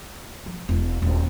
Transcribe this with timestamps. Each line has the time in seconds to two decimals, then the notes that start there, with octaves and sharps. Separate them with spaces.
0.46 F3
0.69 E1
1.02 D#1